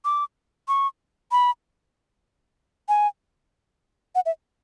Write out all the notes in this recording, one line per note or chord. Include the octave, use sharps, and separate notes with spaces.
D6
C#6
B5
G#5
F#5
E5